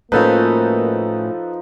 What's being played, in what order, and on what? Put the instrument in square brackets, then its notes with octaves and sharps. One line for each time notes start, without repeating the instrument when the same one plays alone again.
[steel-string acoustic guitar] A2 C#4 F#4 [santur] F3 D#4 [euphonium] A#3 [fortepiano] A4 B4